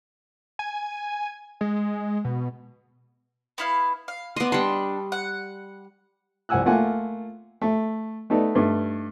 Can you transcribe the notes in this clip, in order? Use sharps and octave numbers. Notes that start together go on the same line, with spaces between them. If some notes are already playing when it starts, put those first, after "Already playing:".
G#5
G#3
B2
B3 E4 F5
F5
B3 D5 D#5 C6
G3 D4 C6 C#6
F#5
C2 F3 F#5 G#5 E6 F#6
A3 A#3 F4 F#5 G#5
A3
A3 B3 D#4 A4 D5
G2 A3 D#4